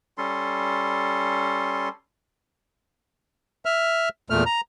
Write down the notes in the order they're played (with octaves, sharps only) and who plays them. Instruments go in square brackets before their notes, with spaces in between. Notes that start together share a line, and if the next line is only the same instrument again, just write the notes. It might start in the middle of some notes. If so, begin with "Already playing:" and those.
[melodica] G3 C#4 A4 C6
[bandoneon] E5 F6
E2 A#2 A3 F6
A#5